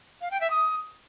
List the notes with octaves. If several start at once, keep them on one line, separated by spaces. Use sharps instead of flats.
F5
G5
E5
D#6